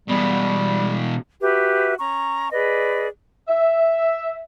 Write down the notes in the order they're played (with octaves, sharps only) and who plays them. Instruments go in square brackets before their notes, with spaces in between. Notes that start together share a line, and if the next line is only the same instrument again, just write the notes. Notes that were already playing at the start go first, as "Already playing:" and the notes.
[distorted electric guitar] B2 E3 [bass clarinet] G3
[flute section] F#4 G4 B4 E5
C#4 A#5 C#6
G#4 B4 D5 D#5
[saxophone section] E5